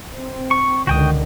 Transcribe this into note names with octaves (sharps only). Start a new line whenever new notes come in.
C4
C#6
C#2 D3 D#3 F#4 G5 D#6